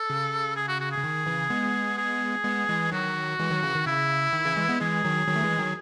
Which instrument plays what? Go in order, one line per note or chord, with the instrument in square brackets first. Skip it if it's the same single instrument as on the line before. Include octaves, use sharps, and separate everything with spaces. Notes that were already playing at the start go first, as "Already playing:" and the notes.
Already playing: [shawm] A4
[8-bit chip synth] C#3
[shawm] G#4
F#4
F#4
G#4
[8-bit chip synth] C#3
D#3
C#3 E3
G#3 B3
[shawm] G#4
[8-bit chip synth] G#3 B3
E3 G#3
[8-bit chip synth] D#3 F#3 [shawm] F#4
[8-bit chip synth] E3 G#3
D#3 F#3
C#3 E3
D#3
[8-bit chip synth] C#3 [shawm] E4
[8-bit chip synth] D#3
C#3 E3
E3 G#3
G#3 B3
[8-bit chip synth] E3 G#3 [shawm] G#4
[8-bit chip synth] D#3 F#3
D#3 F#3
A3
E3 G#3
D#3 F#3